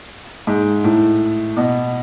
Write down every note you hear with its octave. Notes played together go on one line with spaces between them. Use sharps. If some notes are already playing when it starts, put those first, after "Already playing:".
G#2
A2
B2